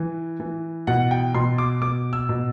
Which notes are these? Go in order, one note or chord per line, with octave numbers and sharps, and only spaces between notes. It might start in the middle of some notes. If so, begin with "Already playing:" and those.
Already playing: E3
E3
B2 F#5
G5
B2 C6
D6
B2 D6
E6
B2